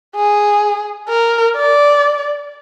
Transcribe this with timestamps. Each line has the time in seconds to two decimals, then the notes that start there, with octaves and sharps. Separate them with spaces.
0.16 G#4
1.10 A#4
1.56 D5